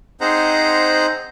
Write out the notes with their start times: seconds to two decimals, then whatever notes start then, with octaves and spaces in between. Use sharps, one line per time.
0.21 C4 D#4 G#4 C5 F#5 A#5